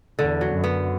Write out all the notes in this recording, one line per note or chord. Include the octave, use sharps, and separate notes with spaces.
E2 D3
F#3
F#2
B3